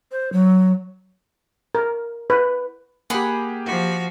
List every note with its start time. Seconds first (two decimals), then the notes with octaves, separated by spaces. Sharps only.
0.12 C5
0.33 F#3
1.75 A#4
2.30 B4
3.10 A#3 G4 G#4 F#5 B5
3.65 F3 F#4